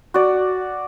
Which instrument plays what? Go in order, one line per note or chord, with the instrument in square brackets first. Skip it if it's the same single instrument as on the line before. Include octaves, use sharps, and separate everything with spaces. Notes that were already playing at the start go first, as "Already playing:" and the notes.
[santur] F#4 D5